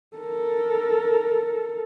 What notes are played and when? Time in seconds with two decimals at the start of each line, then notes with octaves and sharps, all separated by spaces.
0.16 A4 A#4